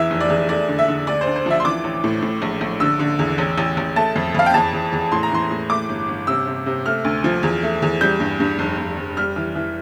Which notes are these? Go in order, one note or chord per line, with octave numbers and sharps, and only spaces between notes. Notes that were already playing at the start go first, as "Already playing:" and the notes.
Already playing: E2 E3 E5
F1
D5
E2
A3 D5
D3
E5
D3
D2 D5
C5
D2
C5
F3 E5
C6
E3 D6
A1
A2
A2
A#1
A#1
D3 E6
D3
E2
A1
A1
A1
A3 A5
F2
F2 F5
G5
E2 A5
E2
E2
A2 C6
A#5
E3 C6
A2
A3 D6
G1
G1
C3 E6
C3
C3
A3 F6
D2
F3
E2
A3
E2
G3 G6
G2
G2
F1
F1
F1
G3 F6
E3
E3